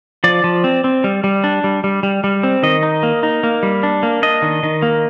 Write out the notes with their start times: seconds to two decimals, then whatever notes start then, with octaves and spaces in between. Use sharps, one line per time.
0.24 F3 D5
0.44 F3
0.64 C4
0.84 C4
1.04 G3
1.24 G3
1.44 D4
1.64 G3
1.84 G3
2.03 G3
2.24 G3
2.43 C4
2.63 D#3 D#5
2.83 D#4
3.03 A#3
3.23 D#4
3.43 A#3
3.63 G3
3.83 D4
4.03 A#3
4.23 D4 D#5
4.42 D#3
4.63 D#3
4.82 A#3